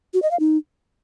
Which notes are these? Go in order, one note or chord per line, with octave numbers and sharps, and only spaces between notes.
F#4
D#5
F5
D#4